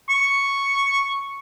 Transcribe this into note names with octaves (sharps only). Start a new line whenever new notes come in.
C#6